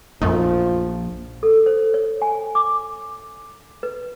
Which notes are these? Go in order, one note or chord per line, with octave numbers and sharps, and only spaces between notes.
A#1 F#2 F3 A3 D#4
A4
C5
C#5
G#5
D6
B4